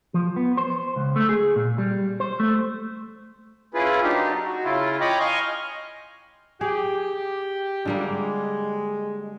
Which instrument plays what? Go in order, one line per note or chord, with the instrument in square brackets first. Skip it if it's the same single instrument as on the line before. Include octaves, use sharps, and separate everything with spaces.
[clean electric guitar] F3
B3
C5
C#2
A3
G#4
A#2
G3
C5
A3
[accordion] C#4 E4 F4 G#4 B4
F#3 A#3 D4 D#4 G4
F#4
C#3 E4 F4
C#5 D#5 G5 A#5 B5 D6
D#5 F5 G#5 C6 C#6 F6
[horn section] G4 [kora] G#4
[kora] D3 G3 A#3 [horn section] G#3